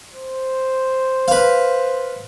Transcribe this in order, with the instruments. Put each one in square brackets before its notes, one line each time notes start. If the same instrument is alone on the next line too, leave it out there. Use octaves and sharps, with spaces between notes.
[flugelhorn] C5
[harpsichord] B4 F5